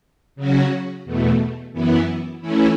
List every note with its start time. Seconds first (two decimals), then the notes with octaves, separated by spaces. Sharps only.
0.36 C#3 F#3 C#4 F#4
1.05 E2 B2 A3
1.73 F#2 E3 B3 E4
2.41 E3 A3 C#4 E4